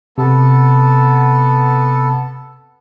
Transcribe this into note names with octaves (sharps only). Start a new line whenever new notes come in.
C3 B3 A4